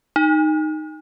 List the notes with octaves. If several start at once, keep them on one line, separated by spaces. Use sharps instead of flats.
D#4